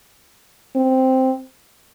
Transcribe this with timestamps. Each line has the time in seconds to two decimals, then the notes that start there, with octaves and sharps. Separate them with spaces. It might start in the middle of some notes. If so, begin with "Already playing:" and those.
0.76 C4